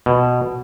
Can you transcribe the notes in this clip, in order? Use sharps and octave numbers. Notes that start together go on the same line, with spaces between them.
B2